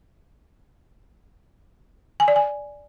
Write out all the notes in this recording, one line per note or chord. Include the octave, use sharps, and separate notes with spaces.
G#5
D5
G#5